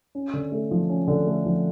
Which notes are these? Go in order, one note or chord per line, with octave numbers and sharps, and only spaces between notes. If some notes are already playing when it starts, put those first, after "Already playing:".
C#4
D3
A3
F3
C#4
D3
A3
F3